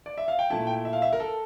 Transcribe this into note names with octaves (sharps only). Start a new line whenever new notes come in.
D5
E5
F5
G5
A#2 A3 E4 A5
G5
E5
F5
E5
A#4
A4